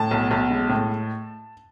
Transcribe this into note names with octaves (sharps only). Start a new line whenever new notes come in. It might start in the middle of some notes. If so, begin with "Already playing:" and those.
Already playing: A2 A5
B1
B1
G#3
A2